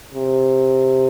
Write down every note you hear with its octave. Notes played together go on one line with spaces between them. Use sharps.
C3